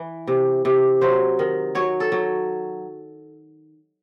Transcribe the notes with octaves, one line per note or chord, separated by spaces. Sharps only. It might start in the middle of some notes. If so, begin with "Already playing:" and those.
Already playing: E3
C3
C3
F#3 C5
D#3
F#3 C#5
A4
F#3